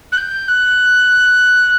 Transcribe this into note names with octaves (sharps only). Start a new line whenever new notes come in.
F#6
G6
F#6